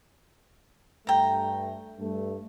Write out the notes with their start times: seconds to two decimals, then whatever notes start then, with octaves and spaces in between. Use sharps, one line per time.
1.07 G2 A3 G5 A#5
1.99 G2 A3